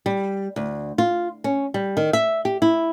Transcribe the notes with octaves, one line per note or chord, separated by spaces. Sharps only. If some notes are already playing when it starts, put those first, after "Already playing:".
G3
D2
F4
C#4
G3
D#3
E5
G4
E4